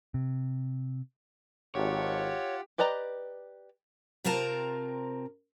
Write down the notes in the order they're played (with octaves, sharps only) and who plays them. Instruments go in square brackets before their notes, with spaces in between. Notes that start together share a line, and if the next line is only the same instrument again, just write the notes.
[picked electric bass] C3
[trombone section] G#1 [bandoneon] F4 F#5 [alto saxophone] G4 [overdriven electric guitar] C#5
[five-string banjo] G4 B4 D5 D#5 A#5
[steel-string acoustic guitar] C3 C4 F4 A#4 A5 A#5